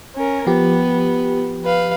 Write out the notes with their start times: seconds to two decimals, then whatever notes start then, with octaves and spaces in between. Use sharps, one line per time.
0.15 C#4 A#4
0.47 F3 B3 G4
1.65 B4 F5